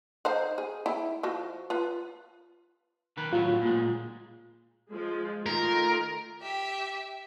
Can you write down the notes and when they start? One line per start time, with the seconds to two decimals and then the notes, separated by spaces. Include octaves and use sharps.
0.25 D#4 C5 F5
0.58 G#4
0.86 E4
1.23 F3 F#4
1.70 F4 B4
3.17 D#3 B4
3.33 A2 F#3 F4
3.62 A#2 G#3
4.92 F3 G#3
5.46 D#3 A3 F4 A#4
6.42 G4 E5